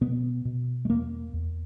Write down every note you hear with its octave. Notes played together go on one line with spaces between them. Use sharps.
B2 B3
B2
A3
E2 A#3
E2